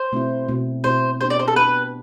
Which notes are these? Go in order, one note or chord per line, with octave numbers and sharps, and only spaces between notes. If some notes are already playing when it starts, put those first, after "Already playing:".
Already playing: C5
B2 A3 C4 E4
B2 A3 C4 E4
B2 A3 C4 E4 C5
B3 D4 G4 C5
D5
C5
A4
B3 D4 G4 B4